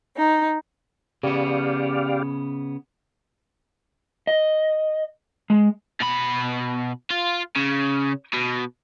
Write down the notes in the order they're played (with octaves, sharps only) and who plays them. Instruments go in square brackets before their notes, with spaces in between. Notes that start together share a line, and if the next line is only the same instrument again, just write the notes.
[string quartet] D#4
[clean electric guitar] C#3 B3 [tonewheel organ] G4 D5 F5
[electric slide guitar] D#5
G#3
[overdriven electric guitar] B2 B5
F4
C#3
B2